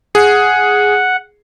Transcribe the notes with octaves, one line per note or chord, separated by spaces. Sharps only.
G#4 F#5